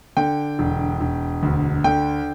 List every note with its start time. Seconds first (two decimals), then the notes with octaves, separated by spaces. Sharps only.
0.17 D3 G5
0.59 E1
1.00 E1
1.43 D2
1.84 D3 G5